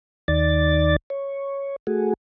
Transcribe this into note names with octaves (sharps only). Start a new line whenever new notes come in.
D#2 D#3 D5 A6
C#5
A3 F#4 G#4